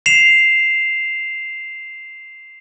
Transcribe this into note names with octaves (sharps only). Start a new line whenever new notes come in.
C7 E7 F7